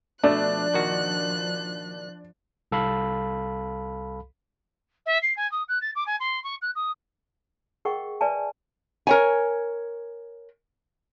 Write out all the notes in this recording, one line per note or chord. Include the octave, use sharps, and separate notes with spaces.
B2 F3 A3 D4 F#6
A#2 D#3 F#4
C2 A4 F5 B5
E5
C7
G#5
D#6
F#6
A6
D6
G#5
C6
C#6
F#6
D#6
G#4 A#4 D#5 F#5 G5 C#6
B4 D5 E5 G#5 A5
A#4 C#5 G#5